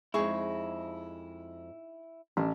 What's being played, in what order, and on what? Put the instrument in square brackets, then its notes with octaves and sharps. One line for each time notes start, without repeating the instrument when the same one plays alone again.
[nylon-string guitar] F2 G#3 [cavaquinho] D#4 G#4 C#6 [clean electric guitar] E4
[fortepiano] A1 [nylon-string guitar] D4